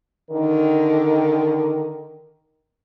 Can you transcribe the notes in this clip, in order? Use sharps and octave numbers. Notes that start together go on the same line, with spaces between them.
D3 D#3 D#4 A#4